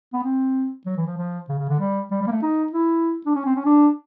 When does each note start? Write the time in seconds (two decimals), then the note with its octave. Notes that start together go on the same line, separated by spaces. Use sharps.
0.13 B3
0.24 C4
0.86 F#3
0.97 E3
1.06 F3
1.17 F3
1.49 C#3
1.59 C#3
1.69 D3
1.79 G3
2.11 G3
2.21 G3
2.27 A#3
2.31 A3
2.42 D#4
2.72 E4
3.26 D4
3.35 C#4
3.45 C4
3.56 C#4
3.65 D4